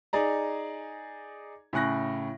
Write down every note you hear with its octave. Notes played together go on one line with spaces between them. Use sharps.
D#4 G#4 D5 A#5
A2 C#3 G#5 C#6 F#6 A#6